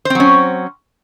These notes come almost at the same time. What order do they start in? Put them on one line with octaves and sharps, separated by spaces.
C5 C4 F#3 C#4